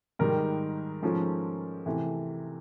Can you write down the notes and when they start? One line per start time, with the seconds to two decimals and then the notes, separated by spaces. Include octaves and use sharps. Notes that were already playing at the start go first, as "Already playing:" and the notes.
0.19 G#2 D#3 G3 A#4
1.03 G#2 F3 A3 C#4
1.86 C3 E3 A3